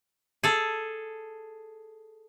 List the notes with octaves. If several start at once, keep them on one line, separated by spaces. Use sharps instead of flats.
G#4 A4